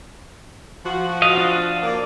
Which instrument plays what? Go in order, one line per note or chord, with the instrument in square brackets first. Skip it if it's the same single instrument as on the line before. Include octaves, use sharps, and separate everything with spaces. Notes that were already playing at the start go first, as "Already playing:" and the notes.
[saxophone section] F3 F#4
[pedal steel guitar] D#5 F5
D4 F5
[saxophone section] A#3 D5